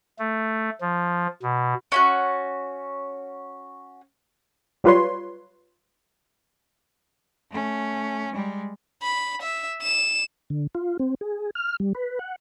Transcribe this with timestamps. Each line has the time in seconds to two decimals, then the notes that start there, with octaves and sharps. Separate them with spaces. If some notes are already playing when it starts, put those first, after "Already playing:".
0.19 A3
0.81 F3
1.42 B2
1.92 C#4 E4 F#4
4.84 F#3 G3 F4 B4 C#5 C6
7.51 A3 C#4
8.32 G3 G#3
9.02 B5
9.42 E5
9.82 E7
10.50 D3
10.75 F4
10.99 C4
11.21 G#4
11.55 F6
11.80 G3
11.95 B4
12.19 F#5